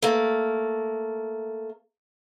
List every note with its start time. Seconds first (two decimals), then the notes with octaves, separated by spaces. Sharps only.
0.02 A3 A#3